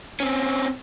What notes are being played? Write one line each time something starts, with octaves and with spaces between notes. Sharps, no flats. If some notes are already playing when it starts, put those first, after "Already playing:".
C4 C#4